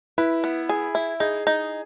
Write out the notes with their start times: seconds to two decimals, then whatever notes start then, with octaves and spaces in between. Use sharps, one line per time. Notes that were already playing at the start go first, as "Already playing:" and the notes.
0.18 E4 B4
0.44 B3
0.69 G#4
0.95 E4
1.20 D#4 G#4
1.47 D#4